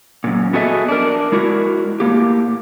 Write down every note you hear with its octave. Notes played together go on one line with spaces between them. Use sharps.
F#2 A#2
B3 F#4 G#4 A4 D#5 E5
D4 A#4
G#3 E4 F#4 A#4
A2 A#3 G4